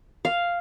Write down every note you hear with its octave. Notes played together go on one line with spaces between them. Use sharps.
F5